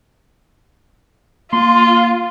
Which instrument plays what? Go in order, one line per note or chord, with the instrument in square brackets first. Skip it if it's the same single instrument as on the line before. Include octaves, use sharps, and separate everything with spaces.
[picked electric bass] A#3 [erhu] F4 [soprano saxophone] C6